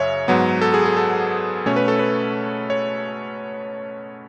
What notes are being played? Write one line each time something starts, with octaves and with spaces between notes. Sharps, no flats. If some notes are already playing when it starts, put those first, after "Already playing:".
Already playing: F#2 C#3 C#5 E5
G#2 F#3 B3
A4
G#4
G#4
A4
B2 A3 C#4 C#5
B4
A4
B4
C#5